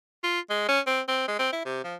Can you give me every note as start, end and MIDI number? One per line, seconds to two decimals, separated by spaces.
0.24 0.40 65
0.50 0.67 56
0.69 0.80 61
0.87 1.01 60
1.08 1.27 60
1.28 1.35 56
1.39 1.49 60
1.53 1.61 64
1.65 1.84 48
1.84 1.96 53